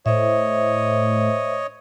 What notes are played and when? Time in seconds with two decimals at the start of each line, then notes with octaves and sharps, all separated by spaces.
0.06 A2 C5 C#5 D#5 E5